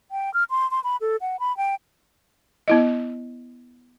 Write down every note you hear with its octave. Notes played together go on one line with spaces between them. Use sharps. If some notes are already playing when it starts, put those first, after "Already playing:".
G5
F6
C6
C6
B5
A4
F#5
B5
G5
B3 E4 D#5